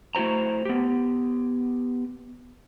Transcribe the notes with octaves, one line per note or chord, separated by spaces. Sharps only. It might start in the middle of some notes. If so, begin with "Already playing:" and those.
A3 E4 F#4 C5 A#5
B3 G4